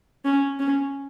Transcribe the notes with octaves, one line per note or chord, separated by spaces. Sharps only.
C#4
C#4